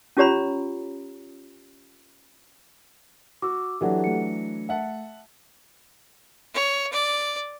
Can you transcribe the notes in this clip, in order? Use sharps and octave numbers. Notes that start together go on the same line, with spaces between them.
C#4 F4 G4 C#5 A#5 B5
F#4 D6 E6
E3 F#3 D4 G4 A4 F#5
A3 C#7
E5 F#5 A5
C#5
D5